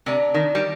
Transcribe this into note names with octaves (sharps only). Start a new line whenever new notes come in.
C3 A#4 D5 A5 D6
D#3
G3